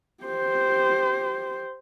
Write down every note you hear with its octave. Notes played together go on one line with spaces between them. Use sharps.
G4 C5